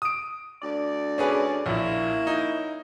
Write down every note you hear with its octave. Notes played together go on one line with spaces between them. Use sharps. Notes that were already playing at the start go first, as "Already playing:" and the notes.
D#6 D7
D2 D5
C#4 G#4 B4
A#1 A#3 C#4 E4
D#4